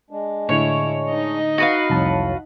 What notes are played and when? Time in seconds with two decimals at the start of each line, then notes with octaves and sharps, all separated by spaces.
0.10 G#3 D4
0.49 A2 D3 E4 C#5
1.09 D#4 D#5
1.58 F#4 B4 F5
1.90 C2 F2 A2 F#3 A5